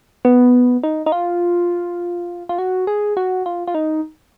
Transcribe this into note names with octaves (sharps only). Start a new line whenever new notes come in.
B3
D#4
D#4
F4
F4
F#4
G#4
F#4
F4
F4
D#4